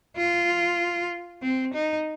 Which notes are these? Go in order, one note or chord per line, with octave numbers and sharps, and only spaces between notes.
F4
C4
D#4